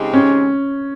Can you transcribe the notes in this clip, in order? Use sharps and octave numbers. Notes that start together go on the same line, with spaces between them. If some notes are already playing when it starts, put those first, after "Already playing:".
Already playing: C#3 G#3 C4 D#4 G4
C#4